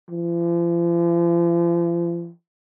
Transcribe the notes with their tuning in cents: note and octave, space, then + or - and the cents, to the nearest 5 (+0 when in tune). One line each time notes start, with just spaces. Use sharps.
F3 -40